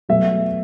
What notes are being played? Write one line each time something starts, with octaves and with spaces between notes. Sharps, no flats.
B2 F#3 A3 E5